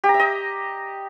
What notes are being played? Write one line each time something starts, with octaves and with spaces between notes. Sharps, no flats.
G4
A#5
E5
D#5